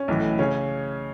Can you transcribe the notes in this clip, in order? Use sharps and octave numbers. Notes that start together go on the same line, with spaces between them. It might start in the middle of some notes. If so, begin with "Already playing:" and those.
Already playing: C#4
B1 A2 E3
C#3 C#4